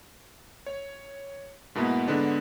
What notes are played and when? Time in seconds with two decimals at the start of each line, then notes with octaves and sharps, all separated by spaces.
0.66 C#5
1.75 G#2 B2 A#3 B3 E4
2.08 G#2 D3 G#3 B3 D4